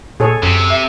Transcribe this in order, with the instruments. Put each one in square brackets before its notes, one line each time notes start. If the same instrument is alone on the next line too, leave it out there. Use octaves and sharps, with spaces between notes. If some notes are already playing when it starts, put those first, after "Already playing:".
[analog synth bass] A#2 [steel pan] G#4 A4 C#5
[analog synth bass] F#2 [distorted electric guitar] C3
[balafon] E5